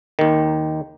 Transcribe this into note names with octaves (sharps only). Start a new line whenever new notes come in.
D#2 D#3